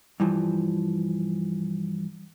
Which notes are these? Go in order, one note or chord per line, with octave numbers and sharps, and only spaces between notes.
G2 E3 F3